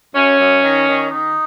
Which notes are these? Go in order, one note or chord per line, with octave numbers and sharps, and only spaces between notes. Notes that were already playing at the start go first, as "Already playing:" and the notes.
F#2 C#4
F#2
D#3
D#3
D#3 D#4